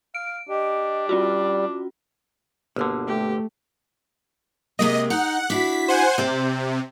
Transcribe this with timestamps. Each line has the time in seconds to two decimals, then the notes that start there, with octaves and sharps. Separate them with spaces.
0.15 F5 D7
0.49 D4 G4 D#5
1.09 G3 C#4 F4 F#4 D5
2.76 G1 B2 D3 A#3
3.08 A3 G4
4.79 C3 G#3 A#3 D#5
5.10 D#4 F#5
5.50 D4 E4 F#4 B6
5.88 C5 F#5 G#5
6.18 C3 C5 D5 G5